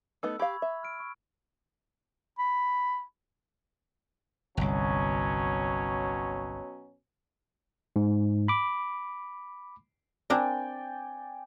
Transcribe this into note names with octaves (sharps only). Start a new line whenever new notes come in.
A3 B3 D#4 E6
G4 F5 B5 C#6 G#6
E5
F6 D7
C#6
B5
G1 C2 B2 F#3 C#4
G#2
B5 D6
C4 D4 A#4 D5 G5 G#5